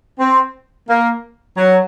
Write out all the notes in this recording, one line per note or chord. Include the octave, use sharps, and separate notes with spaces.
C4
A#3
F#3